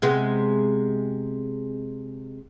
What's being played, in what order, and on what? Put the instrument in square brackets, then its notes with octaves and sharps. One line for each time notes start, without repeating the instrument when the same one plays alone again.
[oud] C3 G#3 B3